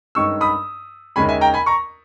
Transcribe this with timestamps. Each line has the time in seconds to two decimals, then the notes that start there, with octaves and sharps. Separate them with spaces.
0.15 G2 D#3 G#3 C#4 C#6 E6
0.41 B5 D#6
1.16 D#2 C#3 G#3 C#4 G#5 B5
1.29 E5 G#5
1.41 G5 A#5
1.54 G#5 B5
1.66 A#5 C#6